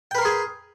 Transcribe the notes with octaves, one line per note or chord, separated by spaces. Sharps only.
G#4 A#4 B4 G5 C6